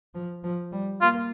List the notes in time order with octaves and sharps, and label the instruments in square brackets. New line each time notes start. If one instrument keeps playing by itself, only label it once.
[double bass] F3
F3
G3
[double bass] A#3 [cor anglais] F4